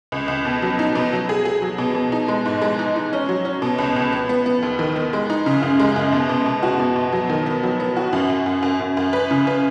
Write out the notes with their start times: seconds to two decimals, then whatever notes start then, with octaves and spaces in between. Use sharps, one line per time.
0.12 C#2
0.28 C#2
0.45 B2
0.62 F#3
0.79 D#4
0.95 B2
1.12 F#3
1.29 G#4
1.45 G#4
1.62 F#3
1.78 B2
1.95 B2
2.12 D#4
2.28 G#3
2.46 G#2
2.62 G#3
2.79 D#4
2.96 D#4
3.13 C#4
3.29 F#3
3.45 C#4
3.62 B2
3.78 C#2
3.96 C#2
4.12 B3
4.29 B3
4.46 B3
4.63 D#2
4.79 D#3
4.96 B3
5.13 G#3
5.30 D#4
5.46 C#3
5.63 F#2
5.79 G#3
5.96 F#2
6.12 B2
6.29 B2
6.46 B2
6.63 F#4
6.80 B2
6.96 B2
7.12 F#3
7.30 D#3
7.46 B3
7.63 F#3
7.80 B3
7.97 F#4
8.13 F#2
8.30 F#2
8.46 F#2
8.63 F#2
8.81 F#2
8.97 F#2
9.13 B4
9.31 C#3
9.47 B4